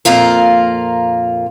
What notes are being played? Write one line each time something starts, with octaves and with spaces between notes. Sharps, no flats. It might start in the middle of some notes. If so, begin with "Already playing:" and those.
F2 A#2 A#3 F4 A#4